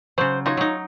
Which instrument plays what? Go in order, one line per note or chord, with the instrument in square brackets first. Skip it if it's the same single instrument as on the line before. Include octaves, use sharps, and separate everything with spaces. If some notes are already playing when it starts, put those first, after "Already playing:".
[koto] C#3 F#3 [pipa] C5
[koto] D#4 [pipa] F4 F#4 C#5
[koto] F#3 D#4